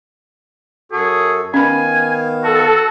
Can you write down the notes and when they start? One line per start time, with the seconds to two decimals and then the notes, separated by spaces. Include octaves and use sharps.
0.92 F#2 F#4 G#4 A4
1.54 D#3 B3 C#4 F5 G#5 B5
2.44 F#4 A4